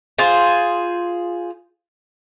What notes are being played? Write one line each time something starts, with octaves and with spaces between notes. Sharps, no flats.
F4 G#4 C5